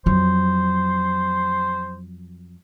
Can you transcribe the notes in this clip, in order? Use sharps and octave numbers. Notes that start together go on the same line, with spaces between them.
F2 F#3 C5